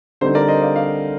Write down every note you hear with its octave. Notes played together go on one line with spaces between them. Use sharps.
D3 G3 C4 D#4 C5
A#4 D5
C5 D#5
D5 F5
D5 F5